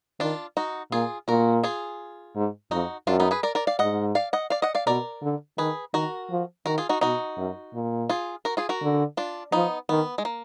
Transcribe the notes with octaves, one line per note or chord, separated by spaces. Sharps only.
D#3 D4 F4
D#4 F#4
A#2 F4 G#4
A#2 F#4 A#4
F4 G#4
G#2
F2 D#4 F#4
F#2 D4 F4
B3 D#4
G#4 B4
A#4 D5
A#4 D5
D5 F5
G#2 D#5 F#5
D5 F5
D#5 F#5
D5 F5
D#5 F#5
D5 F5
B2 A#4 D5
D3
D#3 G#4 B4
D#3 F#4 A#4
F3
D#3 F#4 A#4
F4 G#4
D#4 F#4
B2 D#4 F#4
F#2
A#2
F4 G#4
F#4 A#4
F4 G#4
F#4 A#4
D3
D4 F4
F3 B3 D#4
D#3 B3
G#3
A#3